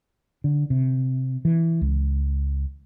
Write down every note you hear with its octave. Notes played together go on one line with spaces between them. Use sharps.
D3
C3
E3
C#2